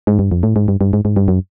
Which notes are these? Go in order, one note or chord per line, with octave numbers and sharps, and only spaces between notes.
G#2
G2
F2
A2
G#2
G2
G2
G#2
G#2
G2
F#2